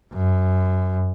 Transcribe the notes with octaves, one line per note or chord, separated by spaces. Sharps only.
F#2